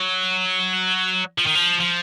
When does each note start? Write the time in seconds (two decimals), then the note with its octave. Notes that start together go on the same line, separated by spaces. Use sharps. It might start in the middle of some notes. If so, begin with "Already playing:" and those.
Already playing: F#3
1.38 F3
1.46 D#3
1.55 F3
1.80 F3